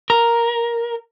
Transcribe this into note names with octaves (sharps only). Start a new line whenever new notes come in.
A#4